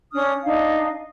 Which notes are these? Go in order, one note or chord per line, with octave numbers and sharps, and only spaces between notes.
C#4 D4 D#6 F6
D4 D#4 F5